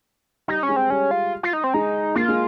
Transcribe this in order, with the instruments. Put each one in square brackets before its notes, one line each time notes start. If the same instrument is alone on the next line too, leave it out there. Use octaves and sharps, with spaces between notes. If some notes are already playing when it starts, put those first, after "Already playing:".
[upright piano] G3 [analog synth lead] D#4
[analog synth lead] C#4
[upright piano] G#3
[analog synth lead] C4
[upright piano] G3 [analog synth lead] C#4
[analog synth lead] F4
F4
D#4
C4
[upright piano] G#3 [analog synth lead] D#4
[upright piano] A#3 [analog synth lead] F4
[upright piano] G#3